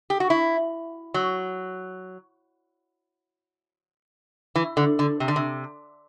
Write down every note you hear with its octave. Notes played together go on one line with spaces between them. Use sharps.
G4
F#4
E4
F#3
E3
D3
D3
C3
D3
C3